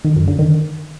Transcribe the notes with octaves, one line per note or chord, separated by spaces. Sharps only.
D#3
F#2
D3
D#3